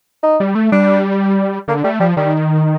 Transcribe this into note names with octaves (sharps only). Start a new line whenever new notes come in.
D#4
G3
A3
G3 D4
D3 A#3
G3 A3
F3 G3
D#3 G3